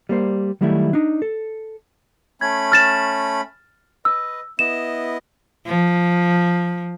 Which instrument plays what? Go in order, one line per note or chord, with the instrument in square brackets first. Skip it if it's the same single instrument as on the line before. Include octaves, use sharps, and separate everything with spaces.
[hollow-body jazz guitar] G3 A#3 C5
D#3 F#3 G3 A3 E4
D4 D#4
A4
[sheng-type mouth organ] A3 C#4 B5 [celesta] G#6
[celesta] F6 A6 E7
[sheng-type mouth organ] B4 D#5 [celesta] E6
[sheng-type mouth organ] B3 E4 D#5 [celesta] E7
[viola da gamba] F3